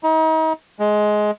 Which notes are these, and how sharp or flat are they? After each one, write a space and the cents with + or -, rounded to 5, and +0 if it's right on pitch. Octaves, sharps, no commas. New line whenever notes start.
D#4 +35
G#3 +15